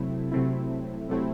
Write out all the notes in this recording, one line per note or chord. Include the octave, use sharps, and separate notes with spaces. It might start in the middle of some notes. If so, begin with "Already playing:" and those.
Already playing: C3 F#3 A3 C4 E4
C3 F#3 A3 C4 E4
C3 F#3 A3 C4 E4